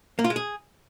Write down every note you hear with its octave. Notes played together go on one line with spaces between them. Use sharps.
A#3
F4
G#3
G#4